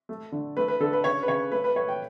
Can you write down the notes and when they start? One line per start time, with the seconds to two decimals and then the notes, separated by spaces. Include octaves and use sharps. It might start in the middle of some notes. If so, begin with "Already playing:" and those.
0.09 A3
0.32 D3
0.57 A3 B4
0.68 B4
0.80 D3 A4
0.93 B4
1.04 C#3 C#5
1.23 B4
1.28 C#3 C#5
1.52 A3 B4
1.64 B4
1.75 A3 C#5
1.88 G5